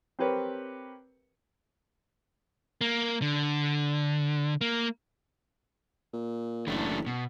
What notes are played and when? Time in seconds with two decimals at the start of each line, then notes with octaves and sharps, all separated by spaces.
0.19 C4 G4 A#4 B4 C#5
2.81 A#3
3.22 D3
4.61 A#3
6.13 A#2
6.67 F#1 E3 A3 D4
7.07 B2